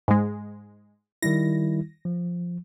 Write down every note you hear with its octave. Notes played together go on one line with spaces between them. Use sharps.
G#2 G#3
D#3 G3 E4 A#6
F3